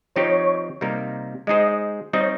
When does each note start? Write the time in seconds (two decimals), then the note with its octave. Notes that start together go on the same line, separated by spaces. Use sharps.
0.16 F3 C4 D#4 G4 C#5
0.81 C3 G3 A#3 D#4 A#4
1.47 G#3 D#4 G#4 C5 D#5
2.13 G3 C4 D#4 D#5
2.21 C#5